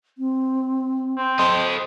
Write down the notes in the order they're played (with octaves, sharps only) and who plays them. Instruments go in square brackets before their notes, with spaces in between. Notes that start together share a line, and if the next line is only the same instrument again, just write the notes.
[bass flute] C4
[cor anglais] C4
[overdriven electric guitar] A4 D#5 [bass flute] C5 [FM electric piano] C6